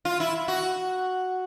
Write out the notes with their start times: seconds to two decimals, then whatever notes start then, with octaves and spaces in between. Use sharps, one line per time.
0.05 F4
0.20 E4
0.48 F#4